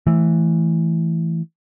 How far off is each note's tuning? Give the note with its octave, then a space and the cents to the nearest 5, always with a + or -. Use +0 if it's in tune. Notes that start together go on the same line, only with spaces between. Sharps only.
E3 +0 A3 +0